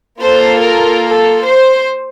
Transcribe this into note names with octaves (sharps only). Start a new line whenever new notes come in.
A#3 F4 A4 C5
A#4
A4
C5